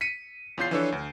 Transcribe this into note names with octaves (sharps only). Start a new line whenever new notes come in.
B6 C#7 D#7
E2 C#4 F4 G6 C7
E3 F3 D4 A4 B4 C#5
D2